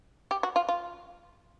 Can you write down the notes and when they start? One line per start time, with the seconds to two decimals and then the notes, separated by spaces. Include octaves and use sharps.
0.31 G4
0.43 F#4
0.56 F4
0.69 F4